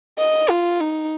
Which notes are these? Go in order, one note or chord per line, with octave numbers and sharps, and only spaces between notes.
D#5
F4
D#4